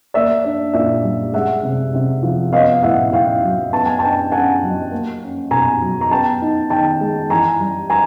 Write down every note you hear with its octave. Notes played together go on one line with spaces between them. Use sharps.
A#3 D5 E5
D4
A#2 D5 E5
G3
G#3 E5 F#5
C3
C3
F3
B3 D#5 F5
A2 E5 F#5
A2 F5 G5
F#3
B3 A5
G#5
D4 G5 A5
C#3 F#5 G#5
F#3
A#3
C#4
B2 G#5 A#5
F#3
A#5
B3 G5 A5
D#4
D#3 G5 A5
G#3
E3 G#5 A#5
G3
G#5 A#5